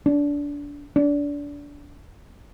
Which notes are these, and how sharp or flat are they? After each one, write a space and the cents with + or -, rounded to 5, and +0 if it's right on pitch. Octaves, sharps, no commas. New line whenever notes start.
D4 -25
D4 -25